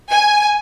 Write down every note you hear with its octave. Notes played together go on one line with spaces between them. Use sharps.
G#5